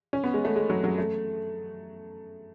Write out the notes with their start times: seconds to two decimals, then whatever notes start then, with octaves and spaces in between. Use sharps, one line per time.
0.13 C#4
0.24 B3
0.34 G#3
0.45 A3
0.56 G#3
0.70 F#3
0.84 F#3
0.98 A3